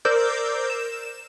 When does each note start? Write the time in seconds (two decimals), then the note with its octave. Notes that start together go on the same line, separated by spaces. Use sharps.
0.05 A#4 C5 D5 D6 E6 G6
0.70 E7